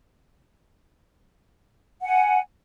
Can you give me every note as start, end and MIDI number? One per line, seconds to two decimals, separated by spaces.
2.02 2.39 78
2.02 2.39 80